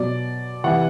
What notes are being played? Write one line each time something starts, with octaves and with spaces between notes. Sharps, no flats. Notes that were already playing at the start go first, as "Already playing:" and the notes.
Already playing: B2 F#3 D5
C3 E3 F#5